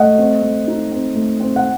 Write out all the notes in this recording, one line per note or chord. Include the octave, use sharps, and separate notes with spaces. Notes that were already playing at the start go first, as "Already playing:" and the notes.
Already playing: A3 D#5 F#5
C4
A3
D#4
C4
A3
C4
F#5